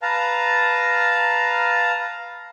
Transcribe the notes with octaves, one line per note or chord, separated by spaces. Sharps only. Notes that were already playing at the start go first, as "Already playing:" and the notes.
B4 F5 A5 A#5